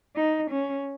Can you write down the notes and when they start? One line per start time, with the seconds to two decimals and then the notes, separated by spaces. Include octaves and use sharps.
0.16 D#4
0.50 C#4